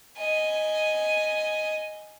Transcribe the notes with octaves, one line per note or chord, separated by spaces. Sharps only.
D#5 G#5